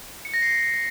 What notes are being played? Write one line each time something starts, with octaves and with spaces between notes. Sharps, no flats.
C#7
A#6
C7